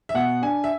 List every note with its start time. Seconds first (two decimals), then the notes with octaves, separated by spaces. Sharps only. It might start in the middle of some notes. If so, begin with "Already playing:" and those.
0.09 E5
0.14 B2 F#5
0.42 D4 G#5
0.64 E5